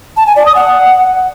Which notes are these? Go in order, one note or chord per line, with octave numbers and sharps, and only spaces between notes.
A5
G#5
D5
D#6
F#5